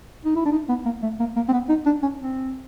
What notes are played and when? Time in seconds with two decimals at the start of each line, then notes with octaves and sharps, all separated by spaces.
0.25 D#4
0.36 E4
0.45 D4
0.52 D#4
0.69 B3
0.85 A#3
1.03 A3
1.20 A#3
1.36 A#3
1.48 C4
1.52 B3
1.69 D#4
1.86 D4
2.03 C#4
2.20 C4